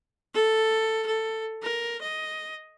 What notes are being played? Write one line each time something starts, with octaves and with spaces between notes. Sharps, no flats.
A4
A4
A#4
D#5